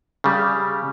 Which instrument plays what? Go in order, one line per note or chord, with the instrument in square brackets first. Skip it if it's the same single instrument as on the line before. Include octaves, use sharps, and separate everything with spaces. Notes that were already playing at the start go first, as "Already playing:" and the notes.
[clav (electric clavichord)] C#3 G3